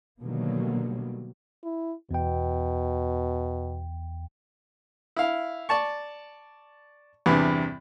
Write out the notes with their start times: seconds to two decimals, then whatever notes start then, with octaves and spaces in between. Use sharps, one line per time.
0.23 B2 D3 D#3 F#3 G3 A#3
1.64 E4
2.11 E2 B2 G5
5.16 E4 F5
5.69 D5 A5 C#6
7.26 E2 G2 C3 E3